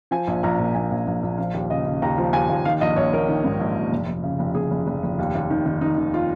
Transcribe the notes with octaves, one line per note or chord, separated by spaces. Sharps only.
F3 G#5
A#1
A#1 A#5
A#2
A#1 G#5
A#1
A#1
A#1
F3 F5
D#2
C#3 D#5
C#3
D#2 A#5
F3
D#2 G#5
D#2
D#3 F5
A#1 D#5
A#1 C#5
A#1 A#4
D#3
G#2
A#1
A#1
F1
F1
C#3
F1
F1 G#4
F1
F1
F1
D#2
D#2
D#3
D#3
D#3 D#4
D#3
F4